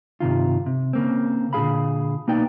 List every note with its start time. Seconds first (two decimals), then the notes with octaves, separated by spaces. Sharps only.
0.20 G2 C3 D#3 F4
0.66 C3
0.93 C#3 A#3 C4
1.53 A#2 D3 F#3 G#4 F5 B5
2.27 B1 A#3 B3 D#4 D5 G5